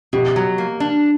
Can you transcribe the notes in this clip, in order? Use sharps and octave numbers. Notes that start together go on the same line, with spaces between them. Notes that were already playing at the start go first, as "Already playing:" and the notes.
B2 G4
F#3
A#3
D4